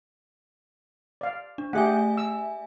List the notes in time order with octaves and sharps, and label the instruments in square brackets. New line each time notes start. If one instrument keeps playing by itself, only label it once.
[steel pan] D5 F5
[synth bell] D4
[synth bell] A3 E5 G#5 [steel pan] G4 G#4 F#5
[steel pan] E6